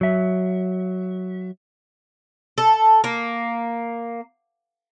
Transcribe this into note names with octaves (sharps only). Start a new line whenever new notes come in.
F#3 E5
A4
A#3